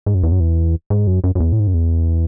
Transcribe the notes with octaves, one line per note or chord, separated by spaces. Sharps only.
G#2
F#2
E2
F#2
E2
G#2
F#2
F#2
F#2
E2
A2
G#2
F#2
E2